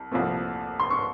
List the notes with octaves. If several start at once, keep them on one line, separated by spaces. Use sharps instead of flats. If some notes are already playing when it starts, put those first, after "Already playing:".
Already playing: C2
C2 A#2 F3 A3 C4
C6
C#6